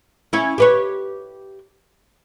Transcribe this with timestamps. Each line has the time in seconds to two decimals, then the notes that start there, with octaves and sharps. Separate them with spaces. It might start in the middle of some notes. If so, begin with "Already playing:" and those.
0.33 C#4 E4
0.58 G4 B4 C#5